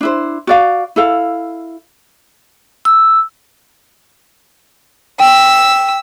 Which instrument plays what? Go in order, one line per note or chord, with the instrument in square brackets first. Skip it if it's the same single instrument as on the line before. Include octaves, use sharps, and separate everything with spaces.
[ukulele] D4 E4 C5
F#4 D5 F5
E4 A4 F5
[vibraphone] E6
[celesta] G5 [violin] E6 B6